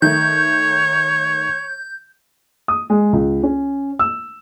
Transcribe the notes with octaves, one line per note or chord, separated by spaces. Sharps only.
D#3 A3 C#5 G6
D#6
G#3
C#2
C#4
E6